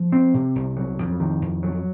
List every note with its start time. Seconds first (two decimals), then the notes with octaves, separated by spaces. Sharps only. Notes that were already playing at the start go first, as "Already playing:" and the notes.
Already playing: F3
0.13 C4
0.34 C3
0.55 C2
0.77 F#3
0.99 F2
1.20 D#3
1.42 F2
1.63 F#3